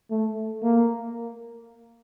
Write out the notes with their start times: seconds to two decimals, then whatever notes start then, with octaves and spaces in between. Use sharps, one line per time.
0.10 A3
0.63 A#3